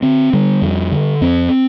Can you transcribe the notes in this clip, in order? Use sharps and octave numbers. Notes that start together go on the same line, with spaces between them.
D3 C4
D3 G3
F2
D3
F2 C4